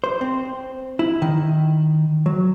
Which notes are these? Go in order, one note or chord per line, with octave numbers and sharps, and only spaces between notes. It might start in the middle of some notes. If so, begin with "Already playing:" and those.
C5
C4
E4
D#3
F#3